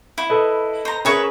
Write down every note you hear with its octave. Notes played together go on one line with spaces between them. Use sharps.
E4
A4 B4 D#5
C5 A#5
C#4 G#4 A#4 B4 C#5 E5